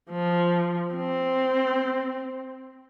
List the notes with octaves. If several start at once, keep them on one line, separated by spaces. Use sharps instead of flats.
F3
C4